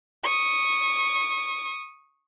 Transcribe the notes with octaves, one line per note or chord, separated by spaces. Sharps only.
C#6 D#6